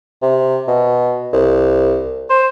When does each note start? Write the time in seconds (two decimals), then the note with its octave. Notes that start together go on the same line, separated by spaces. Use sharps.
0.22 C3
0.67 B2
1.33 C2
2.30 C5